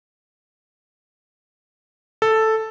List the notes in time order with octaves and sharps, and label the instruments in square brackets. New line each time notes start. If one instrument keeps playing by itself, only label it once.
[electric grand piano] A4